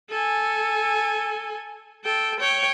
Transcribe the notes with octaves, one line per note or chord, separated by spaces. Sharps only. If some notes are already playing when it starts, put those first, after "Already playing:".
A4 G#5
A4 G5
C#5 G5